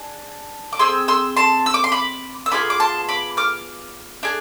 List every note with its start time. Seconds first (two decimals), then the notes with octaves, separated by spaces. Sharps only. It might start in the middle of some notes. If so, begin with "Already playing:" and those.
Already playing: D4 G#4
0.73 D6
0.79 C4 G#4 C6 E6
1.08 C6 E6
1.37 A5 C6
1.66 E6
1.74 D6
1.84 C6
1.92 B5 D6
2.46 E6
2.51 B3 D4 F4 G#4 B5 D6
2.70 D6
2.80 A5 C6
3.09 B5 D6
3.37 D6 F6
4.23 D4 G#4